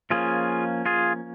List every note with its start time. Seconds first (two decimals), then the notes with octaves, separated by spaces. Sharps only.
0.10 F3 A#3 C#4 F4 G#4
0.86 F4 G#4